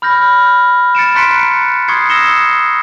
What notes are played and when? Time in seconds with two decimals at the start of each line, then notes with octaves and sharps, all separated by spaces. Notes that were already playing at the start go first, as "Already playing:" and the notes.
0.02 B5 F6 G6 A#6
0.95 A6 C#7 D7 E7
1.15 A#5 C6 F#6 B6 C#7 D7
1.88 C6 C#6 D#6 G#6 C7 C#7
2.10 D#6 E6 A#6 C#7 E7 G7